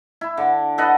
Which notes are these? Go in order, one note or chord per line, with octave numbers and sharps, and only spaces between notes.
E4
D3
A4 B4 D#5 F#5